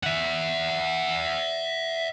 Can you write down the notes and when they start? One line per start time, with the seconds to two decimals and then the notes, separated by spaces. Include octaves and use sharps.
0.03 E5 F#5